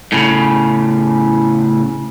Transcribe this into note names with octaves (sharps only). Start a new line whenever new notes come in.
A2 C#3